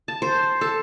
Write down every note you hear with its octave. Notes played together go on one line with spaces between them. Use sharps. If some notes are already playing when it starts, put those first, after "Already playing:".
A5
C5
A4